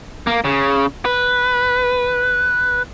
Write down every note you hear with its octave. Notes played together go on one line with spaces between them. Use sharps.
A#3
C#3
B4